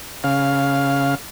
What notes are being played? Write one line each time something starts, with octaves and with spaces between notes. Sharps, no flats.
C#3 F5